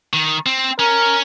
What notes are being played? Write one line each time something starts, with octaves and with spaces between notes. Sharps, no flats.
D#3
C4
C#4 A#4